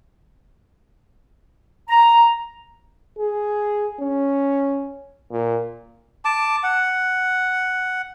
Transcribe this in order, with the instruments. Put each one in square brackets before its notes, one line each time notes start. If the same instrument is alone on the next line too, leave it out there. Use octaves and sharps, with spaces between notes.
[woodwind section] A#5
[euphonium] G#4
C#4
A#2
[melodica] A5 D6
F#5